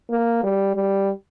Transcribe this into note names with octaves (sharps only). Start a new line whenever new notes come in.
A#3
G3
G3